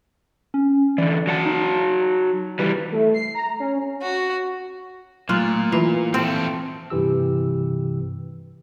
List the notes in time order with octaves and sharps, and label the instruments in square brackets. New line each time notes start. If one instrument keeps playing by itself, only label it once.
[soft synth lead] C#4
[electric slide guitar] D3 E3 [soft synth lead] D5
[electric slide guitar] F#3 F#5 A5
[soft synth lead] D#4
[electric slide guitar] E3 G3 [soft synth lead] B4
[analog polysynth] A3
C7
A#5
C#4
[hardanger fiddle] F#4
[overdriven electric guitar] A#2 [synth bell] F#3 A3 [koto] F4
[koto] E3 [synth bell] F4
[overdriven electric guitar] F3 A3 [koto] C4 [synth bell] D7
[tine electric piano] G2 C3 E3 G4 E6